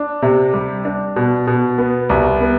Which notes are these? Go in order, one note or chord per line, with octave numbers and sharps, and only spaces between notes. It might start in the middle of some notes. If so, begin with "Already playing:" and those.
Already playing: D4
C3
G3
D4
B2
B2
B3
C2
B3